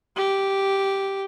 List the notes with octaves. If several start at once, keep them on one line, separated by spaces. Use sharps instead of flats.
G4